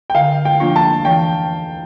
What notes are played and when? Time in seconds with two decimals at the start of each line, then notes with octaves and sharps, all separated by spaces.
0.10 G5
0.14 D3 F5
0.45 G5
0.60 F3 A#3 D4 F4
0.76 A5
1.05 E3 G5